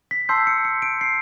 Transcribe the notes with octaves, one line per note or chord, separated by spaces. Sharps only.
B6
A5 C6 E6 G6 C7
C#7
C#7
D7
C7